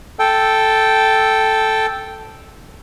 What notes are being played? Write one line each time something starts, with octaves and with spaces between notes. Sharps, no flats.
A4 G5